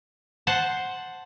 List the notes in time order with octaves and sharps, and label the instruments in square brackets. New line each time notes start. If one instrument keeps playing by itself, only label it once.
[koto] C5 F#5 A5